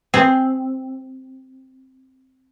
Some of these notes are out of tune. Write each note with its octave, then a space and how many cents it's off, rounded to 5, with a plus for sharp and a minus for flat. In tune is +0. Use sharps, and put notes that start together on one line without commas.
C4 +0 G#4 +0